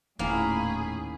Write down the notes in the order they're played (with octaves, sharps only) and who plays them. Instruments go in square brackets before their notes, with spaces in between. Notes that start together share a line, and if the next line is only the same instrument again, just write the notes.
[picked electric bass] D#1 [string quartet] A2 G#4 B5 [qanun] D#3 C#4 E4 [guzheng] A#3